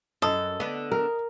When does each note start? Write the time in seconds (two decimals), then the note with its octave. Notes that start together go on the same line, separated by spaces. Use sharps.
0.22 F#2 A4 D#5 D#6
0.60 D3 B3
0.92 A#4